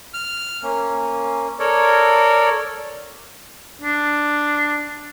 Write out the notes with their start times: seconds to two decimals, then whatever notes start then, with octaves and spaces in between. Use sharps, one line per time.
0.14 F6
0.63 A#3 C#4
1.59 A4 A#4 C#5 D5
3.81 D4